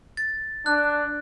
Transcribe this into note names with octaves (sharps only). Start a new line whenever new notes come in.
A6
D4 F#6